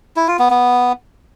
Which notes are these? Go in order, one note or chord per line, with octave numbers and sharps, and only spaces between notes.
E4
F4
B3
B3